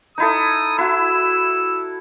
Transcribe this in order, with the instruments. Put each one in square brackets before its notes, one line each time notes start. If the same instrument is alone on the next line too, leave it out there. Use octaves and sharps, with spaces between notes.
[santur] D#4 E4 A4 [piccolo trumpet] D#6
[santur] E4 F#4 [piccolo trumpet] E6